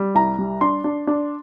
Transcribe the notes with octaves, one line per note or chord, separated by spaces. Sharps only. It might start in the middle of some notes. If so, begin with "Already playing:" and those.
Already playing: G3
C2 A#5
G3
D4 C6
D4
D4